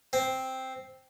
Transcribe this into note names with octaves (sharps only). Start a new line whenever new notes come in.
C4